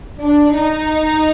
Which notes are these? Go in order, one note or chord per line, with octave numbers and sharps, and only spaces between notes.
D4
D#4